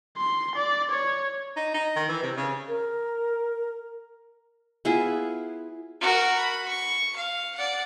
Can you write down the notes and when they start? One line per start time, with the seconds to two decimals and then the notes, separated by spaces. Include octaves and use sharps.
0.17 C6
0.56 D5
0.91 C#5
1.56 D#4
1.74 D#4
1.96 D#3
2.09 E3
2.22 C3
2.37 C#3
2.68 A#4
4.85 B3 E4 F4 G#4
6.01 F#4 A#4
6.38 B5
6.68 C#6
7.16 F5
7.55 D5 F#5